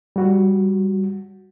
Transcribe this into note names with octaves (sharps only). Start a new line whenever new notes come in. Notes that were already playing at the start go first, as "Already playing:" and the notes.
G3 F#4